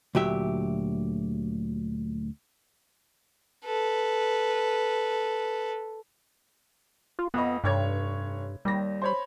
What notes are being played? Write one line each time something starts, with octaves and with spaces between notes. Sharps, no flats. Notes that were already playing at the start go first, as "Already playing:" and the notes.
D2 A#2 F#3 G4 E5
A4 B4
F4
F2 B3 D#5
F1 G2 C#5 G#6
D#2 G3 A#6
C5 C#5 B5